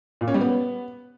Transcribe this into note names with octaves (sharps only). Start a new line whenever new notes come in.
A#2
C#4
G3
B3